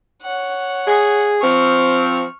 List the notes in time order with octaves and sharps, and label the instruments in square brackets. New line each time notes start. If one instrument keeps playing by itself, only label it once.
[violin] C#5 F#5
[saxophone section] G#4
[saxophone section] F3 C4 [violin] C#6 F6